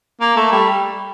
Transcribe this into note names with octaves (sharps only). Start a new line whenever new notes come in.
A#3
A3
G3